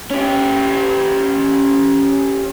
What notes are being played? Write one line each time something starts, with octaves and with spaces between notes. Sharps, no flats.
C#4 G4